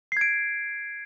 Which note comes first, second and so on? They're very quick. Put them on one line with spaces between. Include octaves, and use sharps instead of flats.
C7 G#6 D7